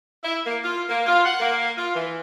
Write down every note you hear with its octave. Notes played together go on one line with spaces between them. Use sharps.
E4
A#3
F4
A#3
F4
F#5
A#3
F4
E3